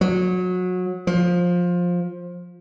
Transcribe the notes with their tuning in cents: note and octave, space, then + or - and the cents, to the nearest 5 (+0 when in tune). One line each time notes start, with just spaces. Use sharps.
F#3 -25
F3 +15